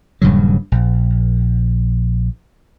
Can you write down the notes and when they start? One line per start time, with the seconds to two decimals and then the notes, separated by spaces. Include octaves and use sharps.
0.22 D#1 G2 C#3 F#3
0.72 A#1